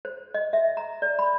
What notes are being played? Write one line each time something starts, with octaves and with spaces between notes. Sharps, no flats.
C5
D#5
E5
A#5
D5
B5